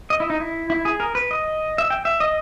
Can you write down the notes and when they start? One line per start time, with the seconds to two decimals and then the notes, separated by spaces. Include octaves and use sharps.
0.10 D#5
0.20 E4
0.30 D#4
0.40 E4
0.70 E4
0.85 G#4
1.00 A#4
1.15 B4
1.31 D#5
1.78 E5
1.90 G5
2.05 E5
2.20 D#5